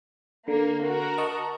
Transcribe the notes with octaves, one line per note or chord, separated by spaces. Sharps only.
D3 A#3
F#4 A#4
D#5 A5 C#6